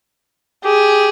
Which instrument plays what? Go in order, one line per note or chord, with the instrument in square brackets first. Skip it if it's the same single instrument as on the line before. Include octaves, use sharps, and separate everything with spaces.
[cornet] G4 [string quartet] G#4